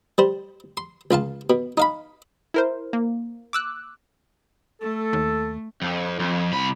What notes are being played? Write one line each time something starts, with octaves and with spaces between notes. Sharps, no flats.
G3 C5
C6
C#2 F4 F5 A5
B2
D#4 F5 B5
E4 A#4 C5
A#3
D6 E6 F#6
A3 A4
D#2
F2
F2
C2 B5